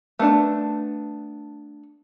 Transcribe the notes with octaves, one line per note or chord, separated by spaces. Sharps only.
A3 B3 D4 A5